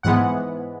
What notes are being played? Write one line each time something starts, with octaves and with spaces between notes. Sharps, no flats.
G#2 E3 G#3 B3 F#5